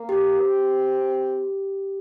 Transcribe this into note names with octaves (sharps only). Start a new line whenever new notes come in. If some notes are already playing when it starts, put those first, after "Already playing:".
Already playing: A#3
G4
C4